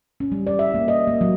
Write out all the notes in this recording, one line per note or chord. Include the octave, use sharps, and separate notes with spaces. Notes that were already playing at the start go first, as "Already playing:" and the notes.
C#4
G3
D5
E5
A#3
D#5
A#3
F#3